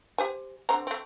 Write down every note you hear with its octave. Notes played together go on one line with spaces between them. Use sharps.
G4 C5 G#5
D3 C4 A#5
A3 C4